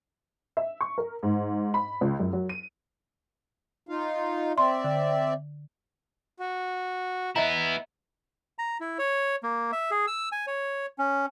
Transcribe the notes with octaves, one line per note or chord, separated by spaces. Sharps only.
E5
C#6
A#4
G#2
B5
C#2
F#2
F#3
D#7
D#4 F4 F5
C4 D5 E5 C6
D3
F#4
B3 E4 D#5 E5 A#5
A#5
E4
C#5
A#3
E5
G#4
E6
G#5
C#5
C#4